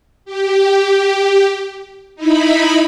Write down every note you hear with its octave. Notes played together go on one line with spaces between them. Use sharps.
G4
D#4 E4 B5